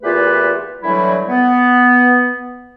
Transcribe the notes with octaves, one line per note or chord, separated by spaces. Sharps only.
E2 A#2 A3 F4 G4 B4
D3 E3 F#3 G3 A3 E4
B3